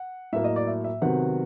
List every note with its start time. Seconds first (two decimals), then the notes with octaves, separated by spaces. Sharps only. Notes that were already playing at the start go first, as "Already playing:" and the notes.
Already playing: F#5
0.33 A2 F#3 A#3 E5
0.44 D#5
0.56 D5
0.67 E5
0.84 E5
1.02 C3 D#3 F#3 B3 F#5